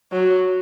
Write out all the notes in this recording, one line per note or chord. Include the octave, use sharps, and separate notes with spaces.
F#3